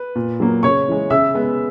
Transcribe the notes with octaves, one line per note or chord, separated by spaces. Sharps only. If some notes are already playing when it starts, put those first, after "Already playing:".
Already playing: B4
A#2
F#3 A#3
C#3 C#5 C#6
E3 G#3
C#3 E5 E6
G#3 B3